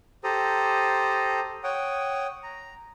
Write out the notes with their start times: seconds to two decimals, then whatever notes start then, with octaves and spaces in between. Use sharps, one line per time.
0.24 G4 A4 C5 A#5 D#6
1.64 C#5 F#5 G5 D#6
2.43 A#5